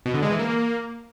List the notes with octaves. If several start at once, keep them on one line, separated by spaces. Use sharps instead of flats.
B2
D3
G#3
E3
A#3